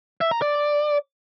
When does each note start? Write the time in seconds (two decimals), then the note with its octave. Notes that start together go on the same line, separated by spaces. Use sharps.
0.21 E5
0.31 A#5
0.42 D5